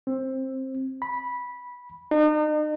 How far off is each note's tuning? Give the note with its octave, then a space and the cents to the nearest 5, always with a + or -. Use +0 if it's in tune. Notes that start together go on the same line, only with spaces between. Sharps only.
C4 +15
B5 -10
D#4 -40